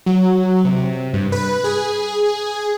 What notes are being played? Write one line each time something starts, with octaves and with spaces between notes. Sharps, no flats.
F#3
C3
G2
B4
G#4